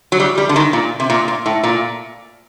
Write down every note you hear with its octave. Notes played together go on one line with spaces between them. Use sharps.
F#3
G3
G3
D3
D#3
A#2
C3
A#2
A#2
A2
A#2